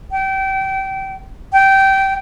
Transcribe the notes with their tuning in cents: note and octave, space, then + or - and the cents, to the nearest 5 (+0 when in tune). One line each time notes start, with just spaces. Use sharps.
G5 -25
G5 -15